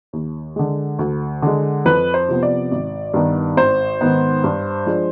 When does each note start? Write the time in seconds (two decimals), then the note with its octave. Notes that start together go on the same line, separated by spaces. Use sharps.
0.13 D#2
0.56 D3 G#3
0.99 D2
1.42 D3 G#3
1.85 F2 B4
2.14 C5
2.29 C3 F3 B3
2.43 D5
2.71 G#1
3.14 G2 D#3 B3
3.57 G#1 C5
4.01 G#2 D#3 B3
4.44 G2
4.86 F3 G#3 D4